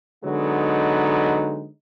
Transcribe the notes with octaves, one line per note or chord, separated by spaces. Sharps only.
D3 F#3 G#3 B3 D#4